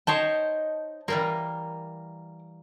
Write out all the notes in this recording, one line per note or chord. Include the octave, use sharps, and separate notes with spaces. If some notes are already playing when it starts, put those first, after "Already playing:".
D#4 C5 C#5 D#5 G5 A5
E3 G3 A#3 A#4